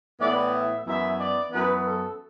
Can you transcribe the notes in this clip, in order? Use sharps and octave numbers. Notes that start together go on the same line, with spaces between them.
A2 E3 B3 E4 D5
E5
F#2 E3 B3 E4 E5
D5
F#2 E3 B3 B4
A4